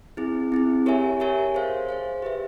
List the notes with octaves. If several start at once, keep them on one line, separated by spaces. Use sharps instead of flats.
C4 E4 G#4
C4 E4 G#4
G4 A#4 C#5 E5 G#5
G4 A#4 C#5 E5 G#5
G#4 C5 F5
G#4 C5 F5
G4 B4 E5